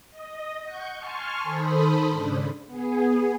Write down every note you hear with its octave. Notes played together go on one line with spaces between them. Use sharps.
D#5
F#5 C#6 G6
G#5 A5 C6 C#6 F6
D#3 A4 C5 B5 D#6
G#2 C#3 D4
B3 G#4